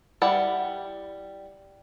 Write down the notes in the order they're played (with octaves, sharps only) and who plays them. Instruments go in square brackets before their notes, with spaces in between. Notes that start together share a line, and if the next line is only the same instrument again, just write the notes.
[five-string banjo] G3 E4 F#5